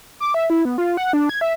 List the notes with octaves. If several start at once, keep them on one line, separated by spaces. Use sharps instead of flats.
D6
E5
E4
B3
F4
F#5
D4
G#6
E5